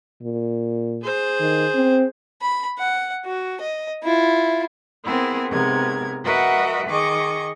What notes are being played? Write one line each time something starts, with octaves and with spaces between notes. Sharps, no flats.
A#2
G#4 C5
D#3
C4
B5
F#5
F#4
D#5
E4 F4
B3 C4 E4 G#4 A#4
G#2 C3 B3 A#4 G#6
F#4 A#4 B4 D#5 E5 F#5
D#3 G#4 D#5 C#6 D6